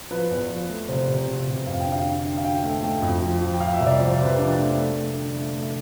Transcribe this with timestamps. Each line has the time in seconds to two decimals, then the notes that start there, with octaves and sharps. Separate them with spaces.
0.11 F3 B4
0.31 E2
0.50 F3
0.69 A3
0.88 C3 C5
1.08 C3
1.27 C3
1.47 C3
1.67 F2 F5
1.80 G5
1.86 D3
1.92 F5
2.05 D3
2.24 D3
2.37 F5
2.44 D3 G5
2.63 A3
2.82 A3 G5
3.02 F2
3.22 F3
3.41 F3
3.54 G5
3.60 F3 F5
3.74 E5
3.80 C2
3.87 D5
3.99 F3 C5
4.13 C5
4.19 C3
4.25 B4
4.38 F3 D4
4.58 A3
4.77 A3
4.96 A3
5.16 D3
5.35 A3
5.55 A3